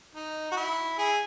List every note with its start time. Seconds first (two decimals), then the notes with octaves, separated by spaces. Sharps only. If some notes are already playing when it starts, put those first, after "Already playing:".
0.15 D#4
0.52 F#4
0.57 E4
0.99 E4 G#4